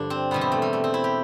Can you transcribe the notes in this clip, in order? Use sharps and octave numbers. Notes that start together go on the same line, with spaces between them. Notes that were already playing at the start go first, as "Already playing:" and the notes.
Already playing: G2 D3 F3 D4
C4
E2 B2 G3 B3
C4
A3
G3
A3
C4
E4
G4